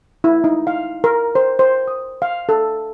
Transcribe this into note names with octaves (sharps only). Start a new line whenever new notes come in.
E4
D#4
F5
A#4
C5
C5
D#6
F5
A4